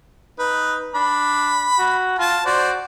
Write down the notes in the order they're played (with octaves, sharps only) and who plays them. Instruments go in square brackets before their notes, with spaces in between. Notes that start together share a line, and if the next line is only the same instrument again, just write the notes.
[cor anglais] D#4 [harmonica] B4
[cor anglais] D4 [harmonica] B5
[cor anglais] F#4
[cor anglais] F4 [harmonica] A5
[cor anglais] F#4 [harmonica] C5 D5